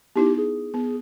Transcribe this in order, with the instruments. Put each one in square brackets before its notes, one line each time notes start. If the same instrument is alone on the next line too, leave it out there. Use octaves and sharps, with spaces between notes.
[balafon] B3 D#4 E4 [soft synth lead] G4
[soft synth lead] G#4
[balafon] B3